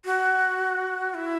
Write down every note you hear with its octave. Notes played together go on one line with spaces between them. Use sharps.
F#4
E4